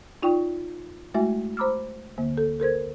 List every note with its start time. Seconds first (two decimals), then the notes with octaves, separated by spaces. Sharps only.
0.22 D#4 F4 D5 G5 C#6
1.14 G#3 A3 E4 F#4 E5 G#5
1.57 C5 A#5 B5 D6 E6 F6
2.18 D2 D3 A#3
2.37 A4
2.60 A4 A#4 C5 G#6